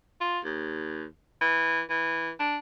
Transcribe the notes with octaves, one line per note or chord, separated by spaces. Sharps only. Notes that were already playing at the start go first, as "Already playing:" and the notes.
F4
D#2
E3
E3
D4